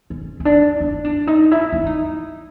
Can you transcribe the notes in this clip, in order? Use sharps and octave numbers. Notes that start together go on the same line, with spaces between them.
C#4
C#4
D4
E4
D4
D#4
E4
E4
D#4